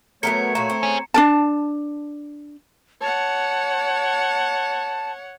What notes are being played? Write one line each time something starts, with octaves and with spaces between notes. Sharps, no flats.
F#3 A3 B3 A#4 C#5 C#7
A#2 F#4 A#5
C4
C#4 G#4
D4 A#4 A5
C#5 F#5 A5